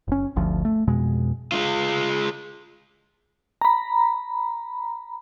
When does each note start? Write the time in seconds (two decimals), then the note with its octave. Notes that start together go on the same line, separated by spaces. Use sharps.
0.08 F#1 C#4
0.36 G1 D2 F3
0.65 A3
0.87 F2 B2 G#3
1.52 G#3 F4
3.61 A#5 B5